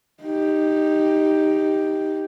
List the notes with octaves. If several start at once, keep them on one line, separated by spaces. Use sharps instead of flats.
D#4 G4